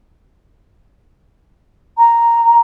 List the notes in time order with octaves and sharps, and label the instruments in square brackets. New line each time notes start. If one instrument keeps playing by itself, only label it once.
[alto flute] A#5